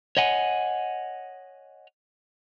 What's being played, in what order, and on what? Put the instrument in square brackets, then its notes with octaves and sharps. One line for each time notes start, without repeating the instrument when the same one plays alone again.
[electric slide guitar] C#5 D#5 F#5 G#5